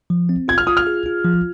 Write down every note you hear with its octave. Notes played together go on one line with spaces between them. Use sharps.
F3
C4
F4 G#6
F6
F4 D#6
F6
G#4
F4
F3